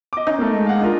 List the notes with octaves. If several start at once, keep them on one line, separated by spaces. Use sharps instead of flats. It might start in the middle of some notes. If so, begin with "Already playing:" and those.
D#5 D6
C#4 D#4
A3 A#3
G#3
F5 F#5
D4 F4 A#4